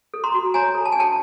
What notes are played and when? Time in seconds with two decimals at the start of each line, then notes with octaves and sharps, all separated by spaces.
0.14 A4
0.24 A#5 C6
0.34 F#4
0.54 C#5 G#5 A#5
0.75 A4
0.85 A5
0.92 G#5
0.96 D4 G5 A5